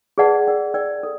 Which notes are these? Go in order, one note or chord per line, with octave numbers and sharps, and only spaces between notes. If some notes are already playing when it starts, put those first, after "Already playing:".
G#4 B4 D5 F#5 A5
A#4 D5 G5
A#4 D5 G5
A4